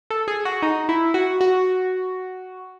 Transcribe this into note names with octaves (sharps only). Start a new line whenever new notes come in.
A4
G#4
F#4
D#4
E4
F#4
F#4